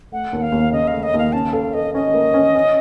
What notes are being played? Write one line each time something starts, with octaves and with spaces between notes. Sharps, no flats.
A3 F#5
D#2
F5
D#2
C#3 D#5
F5
A3
D#5
D#2 F5
C#4 A5
A4 F5
A4 D#5
C#4 D#5
A#3
C#4
C#4